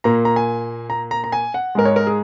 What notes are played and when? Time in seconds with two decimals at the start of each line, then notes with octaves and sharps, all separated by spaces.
0.04 A#2 A#3 A#5
0.25 A#5
0.36 G#5
0.90 A#5
1.11 A#5
1.24 A#5
1.32 G#5
1.54 F#5
1.75 G#2 G#3 A#4
1.85 C#5
1.96 A#4
2.07 G#4